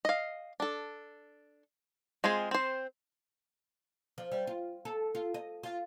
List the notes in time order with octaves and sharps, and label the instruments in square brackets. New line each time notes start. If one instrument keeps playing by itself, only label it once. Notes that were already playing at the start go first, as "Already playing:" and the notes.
[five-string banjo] D#5 F5
D4 A4
G#3 C4 F4 G#4
C4 C5
[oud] F3
G3
F4
A4
F4
D#5
F4